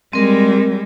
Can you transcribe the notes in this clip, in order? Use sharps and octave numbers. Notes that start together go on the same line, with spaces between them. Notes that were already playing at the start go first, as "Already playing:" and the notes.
G3 G#3 C4 A#4